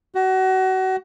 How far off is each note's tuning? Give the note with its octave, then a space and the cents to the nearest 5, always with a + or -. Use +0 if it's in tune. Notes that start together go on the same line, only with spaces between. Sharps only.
F#4 +30